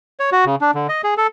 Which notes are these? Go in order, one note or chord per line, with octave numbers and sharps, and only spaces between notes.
C#5
F#4
C#3
D4
D3
D#5
G#4
A4